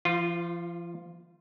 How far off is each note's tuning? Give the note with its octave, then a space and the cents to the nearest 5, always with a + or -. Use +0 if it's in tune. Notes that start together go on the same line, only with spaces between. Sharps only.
F3 -35 F4 +5